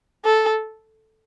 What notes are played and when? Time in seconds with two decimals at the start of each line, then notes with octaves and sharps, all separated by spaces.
0.24 A4